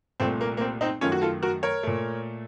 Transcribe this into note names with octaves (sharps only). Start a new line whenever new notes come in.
C2 A#2 A3 C4
A#3
A#3
C4
C4 D#4
F#2 D#3 A3 C#4 F4
F#4
F4 A4
F#4 A#4
A#4 C#5
A#2 A3